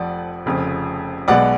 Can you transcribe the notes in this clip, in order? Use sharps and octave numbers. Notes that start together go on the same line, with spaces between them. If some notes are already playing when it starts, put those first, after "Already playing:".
Already playing: F1 F2 F3 D5 F#5
F1 F2 C#3
B1 B2 G#3 B3 D5 F#5